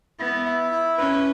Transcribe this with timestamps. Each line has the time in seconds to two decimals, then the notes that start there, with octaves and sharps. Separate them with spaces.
0.20 B3 E4
0.46 E5
0.71 E4
0.98 C#4 B4